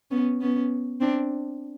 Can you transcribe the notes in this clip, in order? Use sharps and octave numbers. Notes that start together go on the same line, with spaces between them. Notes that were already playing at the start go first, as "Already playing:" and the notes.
B3 C#4
B3 C#4
C4 D4